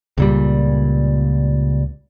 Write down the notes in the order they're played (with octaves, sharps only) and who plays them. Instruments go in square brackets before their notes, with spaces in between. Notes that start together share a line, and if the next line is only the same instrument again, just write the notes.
[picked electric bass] C#2 A#2 G3